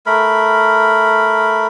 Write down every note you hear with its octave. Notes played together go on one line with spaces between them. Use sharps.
A3 A#4 B5